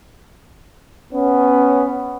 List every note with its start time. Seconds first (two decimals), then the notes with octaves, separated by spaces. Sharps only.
1.13 B3 C#4